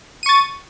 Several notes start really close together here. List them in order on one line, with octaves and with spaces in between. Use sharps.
D#7 C#6 A6